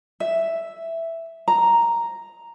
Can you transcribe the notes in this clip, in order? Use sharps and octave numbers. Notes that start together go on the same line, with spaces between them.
E5
A#5